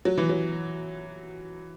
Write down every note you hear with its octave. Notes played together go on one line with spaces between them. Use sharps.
F#3
E3
F#3